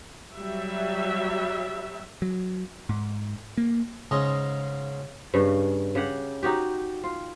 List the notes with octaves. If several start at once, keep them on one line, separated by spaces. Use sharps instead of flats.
F#3 G3 E5
F#3
G#2
A#3
G#2 C#3 C#4 D#5 C6
G2 C#3 C#4
C#3 G4 F#5
D#4 F#4 G4
F4